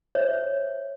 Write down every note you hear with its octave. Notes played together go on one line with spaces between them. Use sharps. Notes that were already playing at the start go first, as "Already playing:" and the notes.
C5 C#5 E5